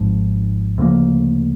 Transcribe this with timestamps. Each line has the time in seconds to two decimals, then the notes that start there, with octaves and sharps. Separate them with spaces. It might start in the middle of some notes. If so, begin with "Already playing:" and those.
Already playing: G#1 G#2 F3
0.78 D2 C#3 F3 A#3